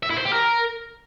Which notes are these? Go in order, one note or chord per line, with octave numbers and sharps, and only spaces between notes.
E5
E4
C5
G4
A#4